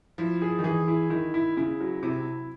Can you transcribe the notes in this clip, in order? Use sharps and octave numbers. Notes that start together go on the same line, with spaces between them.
F3 E4
G#4
D#3
E3 G#4
E4
D#3 E4
E4
C#3 E4
F#3
C3 E4